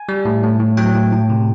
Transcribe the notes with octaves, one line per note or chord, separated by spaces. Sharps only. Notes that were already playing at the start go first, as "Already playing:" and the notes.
Already playing: G#5
G3
A2
A2
A2
F#3 G5
A2
A2
C3